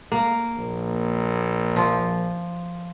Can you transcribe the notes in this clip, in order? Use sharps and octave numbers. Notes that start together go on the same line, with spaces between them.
A#3
A#1
F3